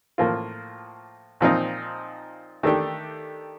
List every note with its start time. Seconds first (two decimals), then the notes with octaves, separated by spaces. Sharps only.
0.18 A2 F3 A#3 F4
1.41 A#2 F3 C4 D#4
2.63 D#3 A3 D4 G4